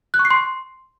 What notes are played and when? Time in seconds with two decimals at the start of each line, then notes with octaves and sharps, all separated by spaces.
0.14 F#6
0.19 C#6
0.25 C7
0.31 C6